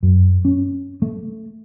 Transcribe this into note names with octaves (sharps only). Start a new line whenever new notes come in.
F#2
C#4
A3